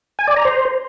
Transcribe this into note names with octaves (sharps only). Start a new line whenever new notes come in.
G#5
D5
A#5
C5